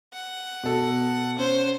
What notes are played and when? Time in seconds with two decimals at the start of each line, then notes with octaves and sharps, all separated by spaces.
0.13 F#5
0.63 B2 A4
1.38 C#4 C5